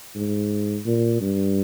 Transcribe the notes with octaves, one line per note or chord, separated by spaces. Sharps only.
G#2
A#2
G2